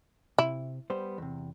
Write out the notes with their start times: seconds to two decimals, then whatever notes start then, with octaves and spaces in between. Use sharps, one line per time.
0.38 C3 E4
0.90 G3 B3 C5
1.18 E2 C3